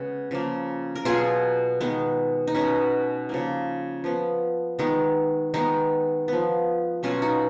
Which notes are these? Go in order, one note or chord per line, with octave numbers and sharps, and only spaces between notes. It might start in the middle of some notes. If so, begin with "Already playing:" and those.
Already playing: C#3 G#3 B3 F#4
C#3 F3 A#3
A#4
B2 F#3 B3 F4 G#4
D#3 G#3 B3
D#4
B2 G#3 B3 C#4
C#3 F3 A#3
F3 B3
D#3 G#3 B3
D#3 G#3 B3 D#4
F3 B3
B2 F#3 B3 C#4 F4
D#4 F#4